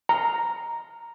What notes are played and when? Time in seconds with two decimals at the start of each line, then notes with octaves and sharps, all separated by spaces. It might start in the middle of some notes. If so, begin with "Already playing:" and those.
0.09 A#5